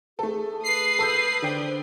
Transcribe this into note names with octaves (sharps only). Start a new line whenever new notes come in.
A3 G#4 A4
B4 D#6 C7
A4 E6 G6
D3 C5 D5 G5